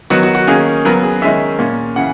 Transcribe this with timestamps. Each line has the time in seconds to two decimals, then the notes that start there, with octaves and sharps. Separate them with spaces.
0.10 D#3 F#3 B3 F#4
0.23 F#4
0.35 F#4
0.47 D#3 A#3 C#4 G#4
0.85 C#3 F#3 B3 A#4
1.03 G#4
1.22 D#3 G#3 C#4 E5
1.59 A#2 A#3 C#4
1.96 C#3 E3 F#5